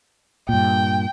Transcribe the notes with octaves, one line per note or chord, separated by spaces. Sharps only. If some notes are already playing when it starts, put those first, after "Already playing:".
G2 A#2 G5